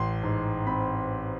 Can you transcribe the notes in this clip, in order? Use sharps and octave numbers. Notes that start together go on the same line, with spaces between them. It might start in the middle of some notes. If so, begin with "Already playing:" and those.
Already playing: A1 C6
G#2
C4 B5